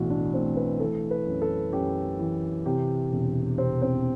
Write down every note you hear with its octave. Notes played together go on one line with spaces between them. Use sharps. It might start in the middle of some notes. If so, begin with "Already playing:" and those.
Already playing: B1 A2 E3 F#4
D4
A2 C4
B4
E3 A4
B4
F#2
A4
F#2 G4
E3
C3 G4
E1
C3 C4
C4